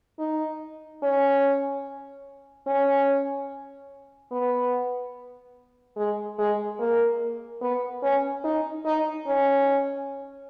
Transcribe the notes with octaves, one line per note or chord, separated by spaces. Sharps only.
D#4
C#4
C#4
B3
G#3
G#3
A#3
B3
C#4
D#4
D#4
C#4